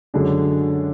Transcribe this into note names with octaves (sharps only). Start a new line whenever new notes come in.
F#2 D3 G#3 D4 F#4